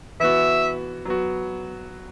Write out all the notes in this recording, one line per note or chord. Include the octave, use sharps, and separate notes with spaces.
E3 B3 F#4 E5
F#3 B3 F#4